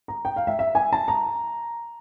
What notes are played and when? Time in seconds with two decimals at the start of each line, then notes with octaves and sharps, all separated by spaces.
0.08 A#5
0.25 G5
0.36 F5
0.47 E5
0.59 E5
0.75 G#5
0.93 A5
1.08 A#5